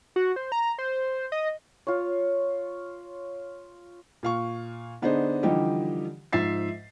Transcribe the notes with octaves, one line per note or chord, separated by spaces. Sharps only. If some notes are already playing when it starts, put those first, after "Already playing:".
F#4
C5
A#5
C5
D#5
F4 C#5
A#2 F5 C#6
D3 B3 D4 D#4 G#4 C5
D3 E3 F3 G3 D#4 G4
G#2 F3 E5 A6 C7